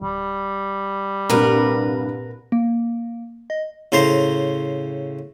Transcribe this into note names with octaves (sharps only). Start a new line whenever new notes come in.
D1 G3
C2 G2 A#2 A#4 B4
A#3
D#5
A2 C#3 C5 A#5 C6